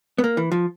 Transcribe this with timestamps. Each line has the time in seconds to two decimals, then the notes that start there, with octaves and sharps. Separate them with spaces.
0.18 B3
0.24 A#3
0.37 E3
0.52 F3